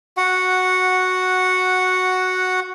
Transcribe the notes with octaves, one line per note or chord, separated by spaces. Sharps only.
F#4 F#5